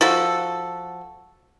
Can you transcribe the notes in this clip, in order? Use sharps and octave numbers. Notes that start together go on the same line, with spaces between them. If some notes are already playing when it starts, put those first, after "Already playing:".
F3 F#4 A4